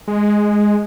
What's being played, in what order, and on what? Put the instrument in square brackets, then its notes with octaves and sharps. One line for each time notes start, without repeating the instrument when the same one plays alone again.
[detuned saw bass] G#3